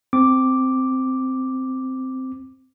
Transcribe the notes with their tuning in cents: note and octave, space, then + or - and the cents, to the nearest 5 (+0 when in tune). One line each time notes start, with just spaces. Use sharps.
C4 -5 D6 +0